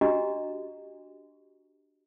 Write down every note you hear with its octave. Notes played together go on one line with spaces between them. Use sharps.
D4 F#4 G4 D#5 A#5